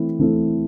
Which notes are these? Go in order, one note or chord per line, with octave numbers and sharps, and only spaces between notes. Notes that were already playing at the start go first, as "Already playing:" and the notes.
Already playing: E3 A3 C4 E4
E3 A3 C4 E4 A4